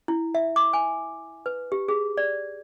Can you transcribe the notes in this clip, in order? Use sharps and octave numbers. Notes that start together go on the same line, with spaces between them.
E4
E5
D6
G#5
B4
G4
G#4
D5